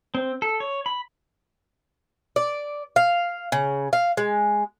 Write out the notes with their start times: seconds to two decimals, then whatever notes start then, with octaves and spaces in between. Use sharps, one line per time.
0.15 C4
0.42 A4
0.60 C#5
0.86 B5
2.36 D5
2.96 F5
3.52 C#3
3.93 F5
4.17 G#3